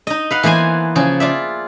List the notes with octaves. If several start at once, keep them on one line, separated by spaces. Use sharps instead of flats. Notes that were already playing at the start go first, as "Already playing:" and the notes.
D#4 D#5
B4 F5 F#5
E3 A#3 B3 C5 G#5
C#3 F3 G#4
F4 D5 E5